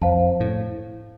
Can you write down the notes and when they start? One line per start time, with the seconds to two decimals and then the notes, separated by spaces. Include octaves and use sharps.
0.01 F2 C5 F5 A5
0.40 A2